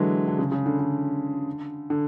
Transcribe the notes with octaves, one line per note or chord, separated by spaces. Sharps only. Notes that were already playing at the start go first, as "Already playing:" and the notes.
Already playing: D3 E3 F#3 G#3
D3
C#3
C#3
D3
D3
D3